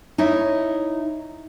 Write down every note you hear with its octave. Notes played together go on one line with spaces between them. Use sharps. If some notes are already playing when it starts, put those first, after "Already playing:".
D#4 E4 C#5 E5